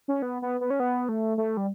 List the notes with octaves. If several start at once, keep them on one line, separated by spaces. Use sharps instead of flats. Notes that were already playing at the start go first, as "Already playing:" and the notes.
C#4
B3
B3
B3
C#4
B3
A3
A3
G3